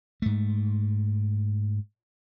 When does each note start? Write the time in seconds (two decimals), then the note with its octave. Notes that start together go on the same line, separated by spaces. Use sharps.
0.22 G#2 A3